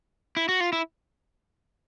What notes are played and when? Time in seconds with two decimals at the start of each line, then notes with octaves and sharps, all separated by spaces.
0.37 E4
0.49 F#4
0.60 F4
0.73 E4